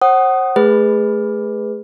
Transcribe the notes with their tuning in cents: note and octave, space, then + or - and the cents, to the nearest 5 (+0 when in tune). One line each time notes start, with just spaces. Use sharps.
C5 +35 F#5 +25 D#6 -5
A3 -15 G#4 -15 B4 +0